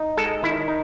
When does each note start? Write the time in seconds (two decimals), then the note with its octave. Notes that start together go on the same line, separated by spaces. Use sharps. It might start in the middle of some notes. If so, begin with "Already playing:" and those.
Already playing: D#4
0.17 G#3 A4
0.43 D#3 E4
0.68 D#4